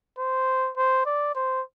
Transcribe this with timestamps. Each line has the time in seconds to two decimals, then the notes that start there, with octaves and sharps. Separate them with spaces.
0.18 C5
0.77 C5
1.06 D5
1.35 C5